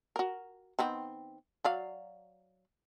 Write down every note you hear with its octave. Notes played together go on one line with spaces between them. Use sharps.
F#4 A#4
D#3 B3 C4
F#3 D5 F5